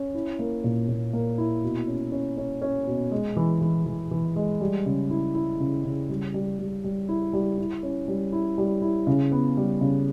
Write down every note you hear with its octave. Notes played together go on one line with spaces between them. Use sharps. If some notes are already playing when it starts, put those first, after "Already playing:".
Already playing: C#4
E4
A#3
A#2
A#2
A#3
E4
B2
C#4
C#4
C#4
C#4
B2
G#3
E3
E3
E3
E3
G#3
G3
C#3
E4
E4
C#3
C#3
G3
G3
G3
G3
E4
G3
E4
C#4
G3
E4
G3
E4
C#3
B3
G3
C#3